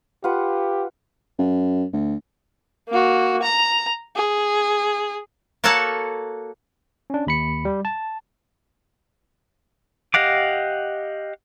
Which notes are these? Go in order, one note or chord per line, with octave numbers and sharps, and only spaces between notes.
F4 G4 B4 F#5
F#2
D2
A#3 F#4
A#5
G#4
A#3 F#4 A4 C#5 F#5 A5
C#4 D4
D#2 B5 C#7
G3
A5
G4 D#5 F5 F#5 D6